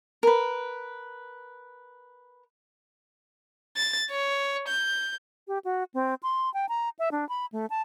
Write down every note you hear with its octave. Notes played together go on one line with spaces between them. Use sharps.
A#4 B4
A6
C#5
G6
G4
F#4
C4
C6
G5
A#5
E5
D4
B5
A3
A5